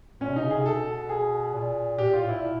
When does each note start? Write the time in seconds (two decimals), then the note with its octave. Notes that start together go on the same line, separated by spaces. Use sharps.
0.20 A#2 C#4
0.28 C3
0.33 B2 D#4
0.44 C#3
0.51 C3 G#4
0.65 B2 A4
1.09 G#4
1.54 A#2
1.98 A#2 G4
2.11 A#2 F4
2.20 A2
2.29 A#2 E4
2.44 B2